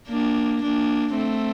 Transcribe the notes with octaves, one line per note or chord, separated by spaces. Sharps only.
A#3 D4
A#3 D4
A3 C4